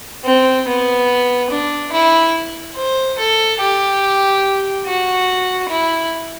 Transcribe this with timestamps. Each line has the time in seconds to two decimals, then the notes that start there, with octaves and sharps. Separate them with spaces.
0.25 C4
0.67 B3
1.51 D4
1.93 E4
2.77 C5
3.19 A4
3.61 G4
4.86 F#4
5.70 E4